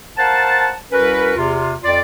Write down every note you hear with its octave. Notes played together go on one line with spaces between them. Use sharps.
A#4 C5 F5 F#5 A5
C2 C#4 F#4 A#4 B4
E2 C3 F4
F2 F4 D5